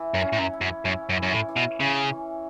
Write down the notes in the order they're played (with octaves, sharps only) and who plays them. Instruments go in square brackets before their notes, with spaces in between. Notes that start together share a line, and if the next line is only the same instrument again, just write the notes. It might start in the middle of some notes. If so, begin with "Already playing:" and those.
Already playing: [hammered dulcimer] E3
[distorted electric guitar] F#2
[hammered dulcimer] C#4
[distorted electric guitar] A2
F#2
[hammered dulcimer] E4
[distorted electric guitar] F#2
[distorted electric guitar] F#2 [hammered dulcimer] C#4
[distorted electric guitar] F#2
[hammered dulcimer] E3
[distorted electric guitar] F#2
A2
[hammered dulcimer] E3
[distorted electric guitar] B2
[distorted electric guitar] C#3 [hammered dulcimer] C#4
[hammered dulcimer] E3